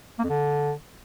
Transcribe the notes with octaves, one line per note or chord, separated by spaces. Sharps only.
A#3
F2
D3